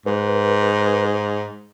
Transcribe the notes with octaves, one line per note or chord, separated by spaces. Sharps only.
G#2 B4